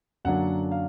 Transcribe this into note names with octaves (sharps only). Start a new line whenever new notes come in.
F#2 D3 F#3 A#3 D4 F#5
F5